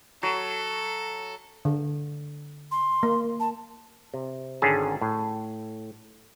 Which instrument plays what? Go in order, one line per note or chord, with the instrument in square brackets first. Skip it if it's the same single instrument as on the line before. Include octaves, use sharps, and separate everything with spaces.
[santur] F#3 [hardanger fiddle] A4
[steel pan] D3
[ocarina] C6
[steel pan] A#3
[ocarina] A5
[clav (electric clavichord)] C3
G#1 G#2 D3 C#4 G#4 A5
A2